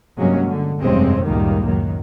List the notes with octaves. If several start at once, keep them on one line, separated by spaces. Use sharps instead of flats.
G2 C3 F#3 G#3 A#3 C#4
D3
F1 G2 C3 G#3 C4 C#4
C#2 F#2 A2 D#3 G3 A#3
F#2 D#3 F#3